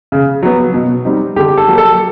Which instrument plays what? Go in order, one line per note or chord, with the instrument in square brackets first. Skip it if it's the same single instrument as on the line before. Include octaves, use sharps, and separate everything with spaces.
[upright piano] C#3
F#3 B3
B2
G3 C4 D#4
D3 G4
A4
F#3 A#3
A4